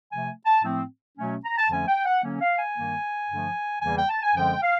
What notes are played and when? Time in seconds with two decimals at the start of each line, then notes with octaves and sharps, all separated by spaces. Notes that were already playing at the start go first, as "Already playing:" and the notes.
0.11 C3 F3 A3 G#5
0.46 A5
0.64 A2 F3 A3 C4
1.17 B2 F#3 A3 C#4
1.45 A#5
1.57 A5
1.70 F2 D3 F3 A3 C#4 G#5
1.87 G5
2.05 F#5
2.23 D3 F#3 A#3 C#4
2.41 F5
2.59 G#5
2.76 G2 D#3 G3 A#3
3.29 G2 D3 F3 A3
3.82 E2 C#3 E3 G3 A#3 G#5
3.96 G5
4.09 A5
4.22 G#5
4.35 F#2 D3 F3 G#3 C4 G5
4.62 F5